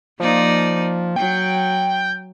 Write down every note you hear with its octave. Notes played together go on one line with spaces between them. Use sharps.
F3 A#3 D#4 D5
F#3 G5